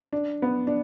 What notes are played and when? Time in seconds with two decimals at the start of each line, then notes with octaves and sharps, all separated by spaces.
0.13 D4
0.42 B3
0.67 D4